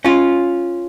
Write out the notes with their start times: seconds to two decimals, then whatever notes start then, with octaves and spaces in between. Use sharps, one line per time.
0.05 C#4 F4